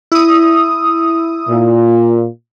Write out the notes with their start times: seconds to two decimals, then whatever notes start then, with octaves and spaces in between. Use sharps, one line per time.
0.12 E4 D#6
1.49 A#2